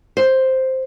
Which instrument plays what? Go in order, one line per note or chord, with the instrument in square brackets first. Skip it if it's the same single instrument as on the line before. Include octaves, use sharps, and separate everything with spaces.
[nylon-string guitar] C5